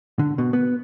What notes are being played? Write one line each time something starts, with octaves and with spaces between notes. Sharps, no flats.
D3
B2
B3